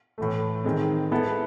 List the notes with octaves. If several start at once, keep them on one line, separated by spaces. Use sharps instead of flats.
A2 E3 A3
D#3 G#3 C4
G#3 B3 E4 A4